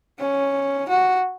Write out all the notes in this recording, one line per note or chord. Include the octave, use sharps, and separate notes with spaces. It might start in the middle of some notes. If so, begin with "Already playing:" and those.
C#4
F#4